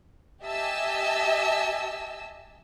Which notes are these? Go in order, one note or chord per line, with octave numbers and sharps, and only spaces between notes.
G4 D#5 E5 G#5 A5 E6